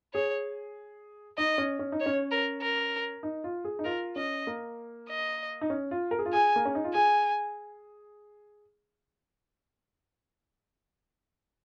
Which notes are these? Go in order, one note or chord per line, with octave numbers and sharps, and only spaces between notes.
G#4 C#5
D#4 D#5
C#4
C#4
D#4
C#5
C#4
A#4
A#4
D#4
F4
G#4
D#4
F4 A#4
C#4 D#5
A#3
D#5
D#4
C#4
F4
A#4
G#4
F4
G#4 G#5
A#3
C#4
D#4
F4
G#4 G#5